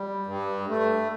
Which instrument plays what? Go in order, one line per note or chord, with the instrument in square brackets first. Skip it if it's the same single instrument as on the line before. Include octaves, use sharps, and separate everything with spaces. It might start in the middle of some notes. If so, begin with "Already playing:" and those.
Already playing: [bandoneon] G3
[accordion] G2
A3